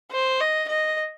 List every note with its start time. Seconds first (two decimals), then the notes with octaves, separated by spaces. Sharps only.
0.11 C5
0.40 D#5
0.69 D#5